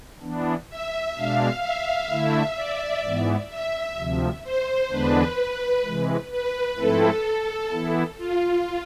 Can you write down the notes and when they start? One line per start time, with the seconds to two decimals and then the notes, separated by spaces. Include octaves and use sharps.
0.22 E3 B3 D4
0.70 E5
1.16 B2 G#3 D4 F5
1.63 E5
2.10 D3 A3 E4 E5
2.56 D5
3.04 G#2 E3 B3
3.50 E5
3.97 D2 C3 F3
4.44 C5
4.90 E2 D3 G#3 B3 D4 B4
5.37 B4
5.84 C3 E3 G#3
6.31 B4
6.77 G#2 F3 A3 C4 E4 A4
7.71 E3 B3 E4
8.18 F4